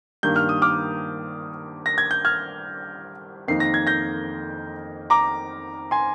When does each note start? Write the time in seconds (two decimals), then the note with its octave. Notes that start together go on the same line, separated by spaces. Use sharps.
0.23 G2 D#3 A#3 G6
0.36 F6
0.49 D#6
0.62 D6 F6
1.86 A#6
1.98 G#6
2.11 G6
2.25 F6 G#6
3.48 F2 D#3 A#3 D#4 C7
3.60 A#6
3.74 G#6
3.87 G6 A#6
5.10 A#5 D6
5.91 G#5 C6